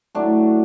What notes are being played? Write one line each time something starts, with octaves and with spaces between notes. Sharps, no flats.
A2 F#3 A3 D4